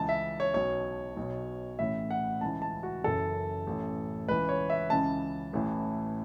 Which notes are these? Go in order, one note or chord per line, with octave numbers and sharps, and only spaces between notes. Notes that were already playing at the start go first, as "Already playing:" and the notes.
Already playing: C#2 C#3 E3 A5
E5
C#5
B1 B2 C#5
B1 B2
A1 A2 E3 E5
F#5
C#2 C#3 E3 A5
A5
F#4
F#1 F#2 C#3 E3 A4
A1 A2 E3
C#2 C#3 E3 B4
C#5
E5
C#2 C#3 E3 A5
A1 A2 E3